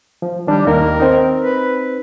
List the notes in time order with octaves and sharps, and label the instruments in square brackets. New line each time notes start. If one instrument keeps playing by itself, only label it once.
[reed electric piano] F3
[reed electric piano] D#3 D4 [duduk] G3
[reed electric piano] D#2 D#3 A#3 [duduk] A#4
[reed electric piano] C4 D#4
[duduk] B4